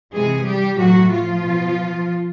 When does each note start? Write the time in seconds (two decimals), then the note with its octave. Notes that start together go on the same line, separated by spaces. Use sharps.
0.14 C3 E3 G#3 G#4
0.46 G3 G4
0.79 A2 E3 F#3 F#4
1.11 F3 F4
1.43 B2